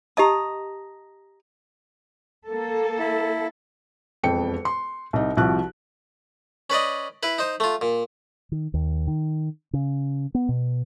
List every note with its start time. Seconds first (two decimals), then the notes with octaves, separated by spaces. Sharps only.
0.17 G4 D#5 A5 A#5 D#6
2.49 A#3 A4
2.99 E4
4.23 E1 F2 G5 C#7
4.65 C6
5.13 C2 D#4
5.37 C2 F3 F#4 F#6
6.70 C#4 B4 D5 D#5
7.23 E4 B4
7.38 D#4 C5
7.60 A3 F4
7.81 A#2
8.52 D#3
8.74 D#2
9.07 D#3
9.73 C#3
10.35 B3
10.49 B2